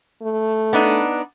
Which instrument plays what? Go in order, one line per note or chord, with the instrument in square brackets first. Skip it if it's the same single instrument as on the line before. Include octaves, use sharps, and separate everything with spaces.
[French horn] A3
[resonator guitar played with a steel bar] B3 D4 D#4